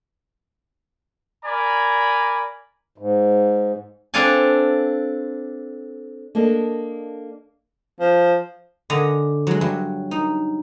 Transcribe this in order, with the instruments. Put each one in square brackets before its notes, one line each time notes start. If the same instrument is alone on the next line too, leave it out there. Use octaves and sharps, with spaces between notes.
[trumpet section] A#4 D5 G#5 A#5 B5
[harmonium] G#2
[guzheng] C4 D4 A4 D5 F5 G#5
[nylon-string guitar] A#3 D4 A4 D#5
[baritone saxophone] F3
[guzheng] D3 D#5 G#5 A#5
F#3 G#3
G2 F#3
D#4